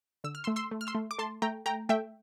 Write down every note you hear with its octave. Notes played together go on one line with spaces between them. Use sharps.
D3 E6
F6
C6 E6
A3
C6 E6
A3
F6
C6 E6
A3
D6
A3 A5 C6
A3 G5 A#5
A3 G5 A#5
A3 E5 G5